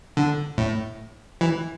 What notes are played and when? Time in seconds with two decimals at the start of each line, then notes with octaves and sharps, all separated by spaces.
0.17 D3
0.58 A2
1.41 E3